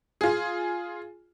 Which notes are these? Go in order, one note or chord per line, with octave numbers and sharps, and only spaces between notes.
F4 G#4